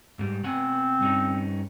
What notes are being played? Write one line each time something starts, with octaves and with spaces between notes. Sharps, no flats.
G#2 G3
B2 C4 F#5 G#5
G2 C#4 D#4